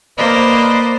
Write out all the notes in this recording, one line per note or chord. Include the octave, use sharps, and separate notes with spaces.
A#3 B4 C5 D5 D#5